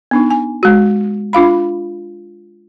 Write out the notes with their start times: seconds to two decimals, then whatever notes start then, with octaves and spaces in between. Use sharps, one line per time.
0.11 B3 D4 D#4
0.30 G#5
0.63 G#3 F#4
1.33 D4 F4 F5 B5